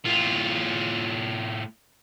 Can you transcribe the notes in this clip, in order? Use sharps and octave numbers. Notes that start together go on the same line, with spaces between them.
A2 F4